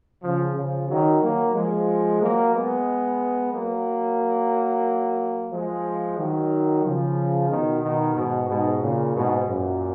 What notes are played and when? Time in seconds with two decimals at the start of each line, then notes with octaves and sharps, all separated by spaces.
0.23 C#3 F3
0.56 C#3 F3
0.89 D#3 F#3
1.22 F#3 A#3
1.55 F3 G#3
2.21 F#3 A#3
2.54 G#3 B3
3.53 F#3 A#3
5.51 F3 G#3
6.17 D#3 F#3
6.83 C#3 F3
7.49 B2 D#3
7.82 B2 D#3
8.15 G#2 B2
8.48 G#2 B2
8.81 A#2 C#3
9.15 G#2 B2
9.47 F#2 A#2